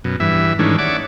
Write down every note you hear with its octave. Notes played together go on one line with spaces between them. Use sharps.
F#2 B2
G2 E3 E5
G#2 D#3 E3 A3 C#4 D4
C#5 D5 E5 F#5 D6